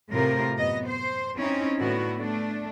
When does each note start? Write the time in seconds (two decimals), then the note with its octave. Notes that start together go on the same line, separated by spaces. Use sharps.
0.11 A2 C3 F4 A#4
0.57 F#2 B3 D#5
0.89 C5
1.38 C4 C#4 D#4 E4
1.79 A2 D3 B3 E4 F#4
2.18 A3 D4